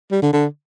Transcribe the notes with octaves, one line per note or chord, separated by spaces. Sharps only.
G3
D3
D3